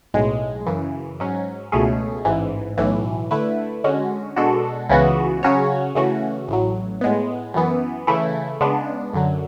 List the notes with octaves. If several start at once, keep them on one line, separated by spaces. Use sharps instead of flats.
B1 A2 G#3
F#2 C#3 E3
G#2 F#3 C#4
C#2 B2 A3 C#4 G#4
A1 G#2 E3
B1 A2 E3
D3 A3 E4 B4
D3 G#3 C#4 F#4
B2 G#3 D4 F#4 A4
C#2 C#3 E3 B3 F#4
C#3 F#3 C#4 F#4 C#5
C#3 E3 A3 C#4 F#4
A1 A2 F#3
A2 G#3 B3
F#2 E3 B3
C#3 E3 A3 E4
C#3 G#3 B3 D4
F#2 D3 F#3